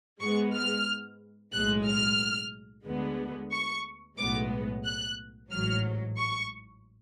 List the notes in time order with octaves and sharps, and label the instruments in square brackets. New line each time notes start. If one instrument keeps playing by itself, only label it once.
[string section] G#2 G#3 B3 C#6
F6
B1 A2 G#3 F#6
F6
D2 D3 G#3 B3
C#6
B1 A2 G#3 B3 D6
F#6
A1 G#2 F#3 F6
C#6